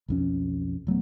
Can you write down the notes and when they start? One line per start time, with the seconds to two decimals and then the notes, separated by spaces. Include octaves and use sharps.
0.08 B1 F2 C#4
0.87 D#1 F#3 A3 B3